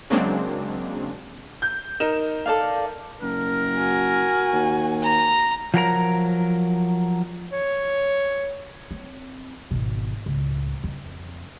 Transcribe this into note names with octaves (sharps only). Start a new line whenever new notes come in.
C#3 F#3 G#3 A#3 C4 D4
G6
D#4 A#4 E7
A4 D5 F5
F#1 A#4
F#4 G#5
D#2
A#5
F3 F#3 A#4 A#5
C#5
C4
G#1 B2
C#2 A2
F2